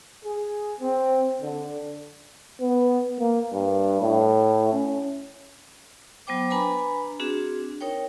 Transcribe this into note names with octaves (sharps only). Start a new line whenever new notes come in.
G#4
C4
D3
B3
A#3
G2
A2
C#4
F#3 B3 C5 G5 D6
D4 B4 G#5 A#5 B5
C4 D4 F#4 G#4
D#4 A#4 C#5 G5